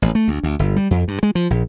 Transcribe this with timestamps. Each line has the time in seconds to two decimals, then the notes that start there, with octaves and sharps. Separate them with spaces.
0.02 A1
0.15 A3
0.28 D2
0.43 D2
0.59 G1
0.76 G3
0.91 F2
1.08 G2
1.23 G#3
1.35 F3
1.50 A#1